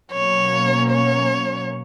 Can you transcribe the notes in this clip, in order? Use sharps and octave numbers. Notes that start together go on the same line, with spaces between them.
B2 F#3 A#3 C#4 C#5
C#5